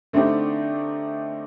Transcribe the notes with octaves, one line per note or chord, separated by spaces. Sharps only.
D3 A3 C4 D#4 G4